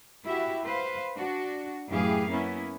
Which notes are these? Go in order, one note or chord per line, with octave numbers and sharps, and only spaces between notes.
E4 F#4 G4 E5
B4 C5 F5
D4 F#4
F#2 A2 E3 G4 G#4 F5
A#3 B3 C#4 E4